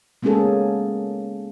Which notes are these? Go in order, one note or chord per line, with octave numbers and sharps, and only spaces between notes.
G#3 A#3 B3 C#4 G#4 A4